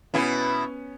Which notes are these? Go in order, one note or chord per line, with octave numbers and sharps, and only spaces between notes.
B2 B3 C#4 E4